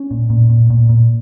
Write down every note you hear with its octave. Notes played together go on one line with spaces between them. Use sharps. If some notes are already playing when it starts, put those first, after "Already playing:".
Already playing: C#4
A#2
A#2
A#2
A#2
A#2